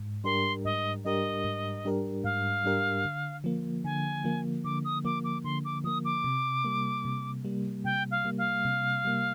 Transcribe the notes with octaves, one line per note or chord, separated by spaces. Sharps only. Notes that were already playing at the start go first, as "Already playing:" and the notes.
Already playing: G#2
G3 D4 G4 A#4 C6
G#2 D#5
G3 D4 G4 A#4 D#5
G#2
G3 D4 G4 A#4
G#2 F5
G3 D4 G4 A#4
D3
F3 A#3
D3 G#5
F3 A#3
D3 D6
D#6
F3 A#3 D6
D6
D3 C6
D6
F3 A#3 D#6
D6
C3
G3 A#3
C3
G3 A#3
C3 G5
F5
G3 A#3
F5
C3
G3 A#3